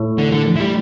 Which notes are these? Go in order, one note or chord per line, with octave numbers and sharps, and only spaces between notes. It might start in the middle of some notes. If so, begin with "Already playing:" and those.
Already playing: A2
D3
D3
E3
G3